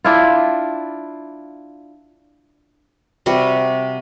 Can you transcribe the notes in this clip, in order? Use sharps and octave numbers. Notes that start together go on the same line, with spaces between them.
D4 E4 F4
C3 G3 F#4